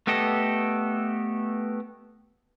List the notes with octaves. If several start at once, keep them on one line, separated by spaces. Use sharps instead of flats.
A3 B3 G4 A4 D#5